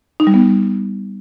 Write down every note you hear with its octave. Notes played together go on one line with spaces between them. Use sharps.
D#4
G3
B3